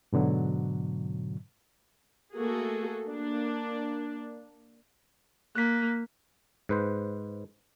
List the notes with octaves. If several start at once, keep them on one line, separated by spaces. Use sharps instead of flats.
G#2 B2 D3 F#3
A3 A#3 F#4 G#4 A4
A#3 D4
A#3 F#6 B6
G#2 B4 C5